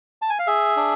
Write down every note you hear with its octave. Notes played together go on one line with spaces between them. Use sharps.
A5
G#5
F5
G#4 E5
D4